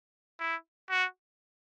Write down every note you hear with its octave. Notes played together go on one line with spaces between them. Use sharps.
E4
F#4